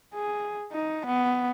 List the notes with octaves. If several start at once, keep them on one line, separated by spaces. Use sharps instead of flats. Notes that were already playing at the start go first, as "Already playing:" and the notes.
G#4
D#4
B3